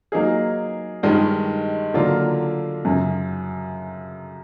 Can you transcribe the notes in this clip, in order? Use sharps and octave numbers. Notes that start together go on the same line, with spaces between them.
F#3 A#3 D#4 G#4
G2 D#3 G#3
D3 F#3 A#3 D4 F4
F#2 C#3 F#3